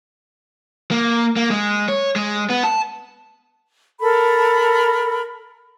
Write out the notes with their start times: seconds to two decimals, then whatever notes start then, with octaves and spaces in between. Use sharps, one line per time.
0.91 A#3
1.36 A#3
1.50 G#3
1.89 C#5
2.16 G#3
2.50 B3
2.64 A5
4.01 A4 A#4 B5